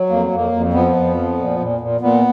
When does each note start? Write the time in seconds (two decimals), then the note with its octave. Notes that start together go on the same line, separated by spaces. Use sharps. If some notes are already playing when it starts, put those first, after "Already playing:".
Already playing: F#3
0.10 F2 A#3
0.31 F2 A#3
0.52 F2
0.73 F3 B3
0.96 F2
1.17 F3
1.37 A#2
1.59 A#2
1.80 A#2
2.01 A#2 B3